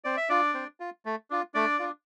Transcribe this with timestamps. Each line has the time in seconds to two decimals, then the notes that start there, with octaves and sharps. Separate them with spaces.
0.04 C4 D5
0.17 E5
0.29 D4 F4 D5
0.54 C4
0.80 F4
1.05 A3
1.30 D4 F4
1.54 A3 D4 D5
1.79 D4 F4